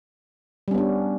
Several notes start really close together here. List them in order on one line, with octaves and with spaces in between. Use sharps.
G3 C#4 B3 D4